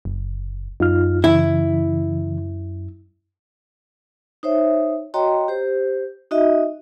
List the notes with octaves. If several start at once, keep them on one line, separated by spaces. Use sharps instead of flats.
F#1
F#2 D#4 F4 F6
C#3 E3 E4
D#4 C5 C#5 E5
F#4 C#5 D#5 G5 A#5 C6
G4 C5
D#4 F#4 D#5 E5